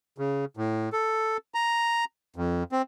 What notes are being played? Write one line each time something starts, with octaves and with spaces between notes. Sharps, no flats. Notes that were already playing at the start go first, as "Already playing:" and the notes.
C#3
A2
A4
A#5
F2
C4